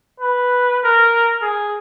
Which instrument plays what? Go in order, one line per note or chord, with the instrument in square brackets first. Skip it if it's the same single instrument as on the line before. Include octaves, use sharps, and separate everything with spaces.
[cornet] B4
A#4
G#4